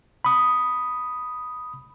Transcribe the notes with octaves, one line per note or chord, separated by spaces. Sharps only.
B5 D#6